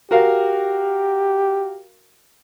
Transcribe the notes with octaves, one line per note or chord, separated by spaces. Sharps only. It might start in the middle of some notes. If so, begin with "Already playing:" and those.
F#4 G4 A#4 F5